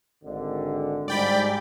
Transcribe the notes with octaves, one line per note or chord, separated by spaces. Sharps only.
G#1 D3
G#2 G3 D5 G5 B5